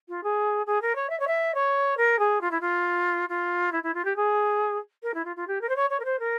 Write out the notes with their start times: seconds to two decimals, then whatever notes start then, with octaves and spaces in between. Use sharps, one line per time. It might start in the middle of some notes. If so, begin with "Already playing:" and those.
0.09 F4
0.24 G#4
0.67 G#4
0.82 A#4
0.95 C#5
1.10 E5
1.20 C#5
1.27 E5
1.55 C#5
1.97 A#4
2.19 G#4
2.41 F4
2.51 E4
2.61 F4
3.29 F4
3.72 E4
3.83 E4
3.94 F4
4.05 G4
4.16 G#4
5.03 A#4
5.14 E4
5.25 F4
5.36 F4
5.48 G4
5.61 A#4
5.69 C5
5.76 C#5
5.90 C#5
6.00 A#4
6.05 C5
6.20 A#4